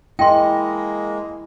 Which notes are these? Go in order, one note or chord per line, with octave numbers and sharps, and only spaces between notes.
G#3 A#3 E4 D#5 G5 C6